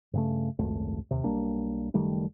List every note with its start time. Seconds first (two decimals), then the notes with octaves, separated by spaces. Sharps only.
0.13 G2 C#3 A3
0.59 G#1 C#2 F#2 A3
1.11 D#2 C3
1.24 B1 G3 A#3 D4
1.94 F#1 D#3 G3 A3